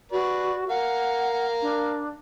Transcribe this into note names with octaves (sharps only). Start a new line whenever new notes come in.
F#4 B4 D5
A#4 F5 F#5
D4